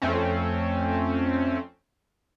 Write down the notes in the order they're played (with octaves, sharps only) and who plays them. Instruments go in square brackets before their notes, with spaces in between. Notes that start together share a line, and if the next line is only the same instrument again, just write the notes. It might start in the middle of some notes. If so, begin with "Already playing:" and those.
[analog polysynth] F2 A3 C4 C#4